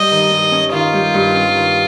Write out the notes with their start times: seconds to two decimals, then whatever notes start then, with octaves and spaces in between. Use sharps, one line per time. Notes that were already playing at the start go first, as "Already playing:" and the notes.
Already playing: G2 G3 D#5
0.11 D#3
0.31 G2
0.52 C#4
0.72 D#3 F4
0.93 G3
1.14 G2
1.34 C#4
1.55 D#3